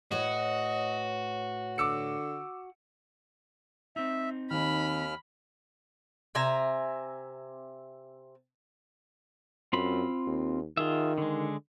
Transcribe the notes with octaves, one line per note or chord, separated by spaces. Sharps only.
A2 F#4 B4 C#5 D#5
D3 D6 E6 C#7
C4 D#4 E5
D#2 D#3 B5 F6
C3 E5 G#5 A#5
F#2 C4 F4 B5
D#2
D#3 F4 G#4 E5
D3 G#3